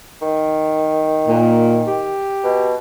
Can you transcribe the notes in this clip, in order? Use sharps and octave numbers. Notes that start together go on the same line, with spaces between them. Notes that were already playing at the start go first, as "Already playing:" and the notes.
D#3
A#2
G4
B2